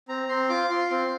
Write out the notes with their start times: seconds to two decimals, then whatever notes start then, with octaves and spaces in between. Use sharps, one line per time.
0.08 C4 A#5
0.29 C4 C6
0.49 F4 D6
0.70 F4 C6
0.90 C4